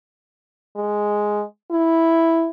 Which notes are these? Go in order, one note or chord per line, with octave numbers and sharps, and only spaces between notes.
G#3
E4